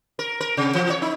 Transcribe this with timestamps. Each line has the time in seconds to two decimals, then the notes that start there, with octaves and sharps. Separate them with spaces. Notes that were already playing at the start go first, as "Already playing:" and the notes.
0.19 A#4
0.40 A#4
0.57 C3
0.75 E3
0.90 C#5
1.02 D#4